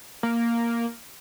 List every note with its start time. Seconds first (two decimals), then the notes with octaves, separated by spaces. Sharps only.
0.23 A#3